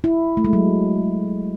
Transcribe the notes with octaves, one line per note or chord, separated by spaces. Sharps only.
E4
A3
G#3
F#3